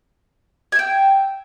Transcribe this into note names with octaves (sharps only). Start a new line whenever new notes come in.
E5 G5 G#5